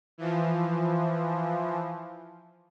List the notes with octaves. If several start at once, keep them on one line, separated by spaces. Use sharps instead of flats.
E3 F3